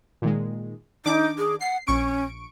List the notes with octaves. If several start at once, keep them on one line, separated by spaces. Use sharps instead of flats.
A#2 D#3 G#3
D#3 D4 D#4 D6
G#4
F#5 C7
A#1 C#4 C#6 D7